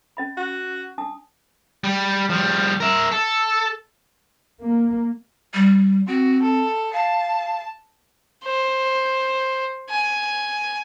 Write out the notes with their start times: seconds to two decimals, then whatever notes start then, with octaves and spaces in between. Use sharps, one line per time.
0.17 C#4 D#5 B5
0.37 F#4
0.98 D4 A5 D#6
1.84 G3
2.29 F3 G3
2.80 A#4 E5
3.12 A4
4.61 A#3
5.54 G3
6.08 C4 F#4
6.42 A4
6.93 F5 A5
8.44 C5
9.90 G#5